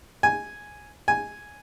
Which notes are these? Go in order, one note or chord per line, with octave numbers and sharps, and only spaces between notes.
G#5
G#5